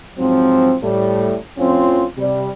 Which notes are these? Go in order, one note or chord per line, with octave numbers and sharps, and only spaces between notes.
G#2 F3 F#3 C4
A2 G3 A3
F2 A2 F3 C4 C#4 F4
C3 G3